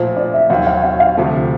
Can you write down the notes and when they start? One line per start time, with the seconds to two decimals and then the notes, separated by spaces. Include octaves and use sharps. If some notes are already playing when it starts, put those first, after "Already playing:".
Already playing: A#2 F3 A3 C5
0.17 D5
0.34 E5
0.50 D#2 D#3 F#3 F5
0.67 F5
0.84 F5
1.00 F5
1.17 D2 C3 F3 A3